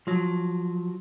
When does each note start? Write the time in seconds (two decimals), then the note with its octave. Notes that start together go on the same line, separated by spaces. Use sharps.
0.07 F3 F#3